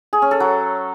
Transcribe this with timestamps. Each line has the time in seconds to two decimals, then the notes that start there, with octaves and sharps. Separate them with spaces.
0.13 G#4
0.22 C#4
0.31 A4
0.40 F#3